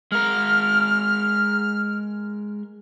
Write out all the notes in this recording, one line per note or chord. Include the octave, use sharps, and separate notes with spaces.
G#3 A#4 F6